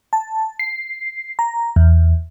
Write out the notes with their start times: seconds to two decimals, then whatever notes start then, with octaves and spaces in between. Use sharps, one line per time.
0.13 A5
0.59 C7
1.39 A#5
1.76 E2